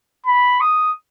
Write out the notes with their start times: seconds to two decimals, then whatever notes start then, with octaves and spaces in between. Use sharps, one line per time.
0.26 B5
0.61 D#6